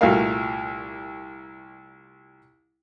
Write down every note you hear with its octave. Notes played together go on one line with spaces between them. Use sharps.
C2 A#2 A3 F#4 A#4 F5